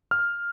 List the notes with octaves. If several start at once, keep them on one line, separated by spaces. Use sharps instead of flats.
F6